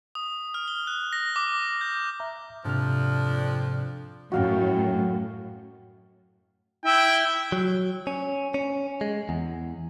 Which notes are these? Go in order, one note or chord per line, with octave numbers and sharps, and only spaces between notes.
D#6
F6
G7
F#6
A#6
D6
G6
E5 A#5
F2 G#2 C3 F3 D4 F6
F#2 A2 F#4 F5 G5
E4 G5
F#3
C#4
C#4
G#3
E2